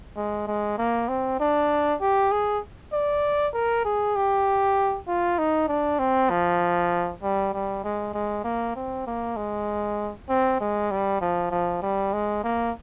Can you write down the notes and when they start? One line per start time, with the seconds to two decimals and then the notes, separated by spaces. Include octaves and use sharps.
0.16 G#3
0.47 G#3
0.78 A#3
1.08 C4
1.40 D4
2.01 G4
2.32 G#4
2.93 D5
3.53 A#4
3.85 G#4
4.16 G4
5.08 F4
5.38 D#4
5.68 D4
5.99 C4
6.30 F3
7.23 G3
7.53 G3
7.84 G#3
8.14 G#3
8.44 A#3
8.76 C4
9.07 A#3
9.37 G#3
10.29 C4
10.60 G#3
10.91 G3
11.21 F3
11.51 F3
11.82 G3
12.13 G#3
12.44 A#3